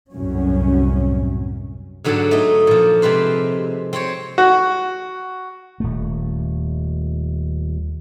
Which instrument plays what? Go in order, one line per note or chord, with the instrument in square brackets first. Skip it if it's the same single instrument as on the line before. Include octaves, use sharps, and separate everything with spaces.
[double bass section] C2 F#2 A2 C#4
[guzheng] G#2 D3 F#3 C#5 G5 A5
A3 D#4 D#5
A#2 F3
C3 G#3 C4 B4 C5
C4 C5 C#5
[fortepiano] F#4
[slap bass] D#1 A3